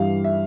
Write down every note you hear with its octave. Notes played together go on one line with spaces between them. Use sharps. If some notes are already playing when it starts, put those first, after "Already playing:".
Already playing: G2 E3 G3 F5
E5